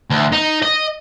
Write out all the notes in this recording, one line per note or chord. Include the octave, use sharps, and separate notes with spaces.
D2
D#4
D#5